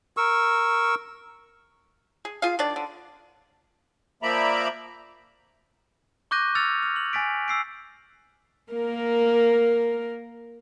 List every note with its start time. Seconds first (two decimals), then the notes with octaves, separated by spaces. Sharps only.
0.17 A#4 C#6 E6
2.25 G#4
2.42 F4 G#4 F5
2.59 D#3 D4 D5
2.76 D3
4.23 F3 A#3 D5 E5 A#5 B5
6.31 C#6 D6 F#6 G6 A#6 D#7
6.55 E6 F6 A6 C#7 F7
6.83 F6
6.96 F#7
7.13 G#5 A6 B6 D7
7.48 E6 C7 D7
8.72 A#3 A#4